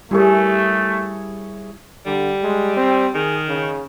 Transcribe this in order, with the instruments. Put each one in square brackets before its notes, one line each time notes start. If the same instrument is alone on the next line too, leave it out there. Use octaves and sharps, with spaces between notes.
[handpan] G3 [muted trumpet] A3 [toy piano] D#4 G4 A#4 [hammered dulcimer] E4 G#4 C#5
[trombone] D3 [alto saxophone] G3
[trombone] G#3
C4
[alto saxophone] D#3 [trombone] G#4
[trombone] C#3